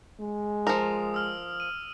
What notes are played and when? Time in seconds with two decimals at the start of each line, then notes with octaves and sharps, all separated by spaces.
0.21 G#3
0.67 F3 A#4 D#6
1.14 E6 F6
1.60 D#7